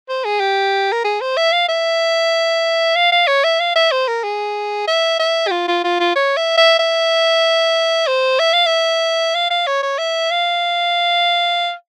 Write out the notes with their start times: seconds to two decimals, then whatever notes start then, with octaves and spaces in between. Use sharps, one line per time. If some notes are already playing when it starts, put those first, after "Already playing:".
0.09 C5
0.25 G#4
0.40 G4
0.92 A#4
1.04 G#4
1.21 C5
1.37 E5
1.52 F5
1.68 E5
2.96 F5
3.12 F5
3.28 C#5
3.44 E5
3.60 F5
3.76 E5
3.92 C5
4.08 A#4
4.23 G#4
4.88 E5
5.19 E5
5.47 G4
5.51 F4
5.68 F4
5.84 F4
6.00 F4
6.16 C#5
6.37 E5
6.58 E5
6.79 E5
8.07 C5
8.39 E5
8.53 F5
8.66 E5
9.35 F5
9.50 F5
9.67 C#5
9.83 C#5
9.98 E5
10.31 F5